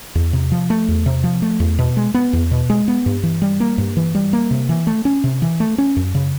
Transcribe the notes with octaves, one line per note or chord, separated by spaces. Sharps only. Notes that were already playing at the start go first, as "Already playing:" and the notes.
E2
C3
F3
A3
E2
C3
F3
A3
E2
B2
G#3
B3
E2
B2
G#3
B3
G2
E3
G3
A#3
G2
E3
G3
A#3
C3
E3
A3
C#4
C3
E3
A3
C#4
F#2
C#3